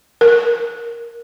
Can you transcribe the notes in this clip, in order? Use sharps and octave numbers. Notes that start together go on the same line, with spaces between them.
A#4